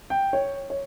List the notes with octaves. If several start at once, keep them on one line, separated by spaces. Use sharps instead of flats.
G5
C#5
C#5